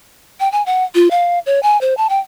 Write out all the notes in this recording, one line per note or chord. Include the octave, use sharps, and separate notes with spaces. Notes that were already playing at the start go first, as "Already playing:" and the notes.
G5
G#5
F#5
F4
F5
C#5
G#5
C5
A5
G5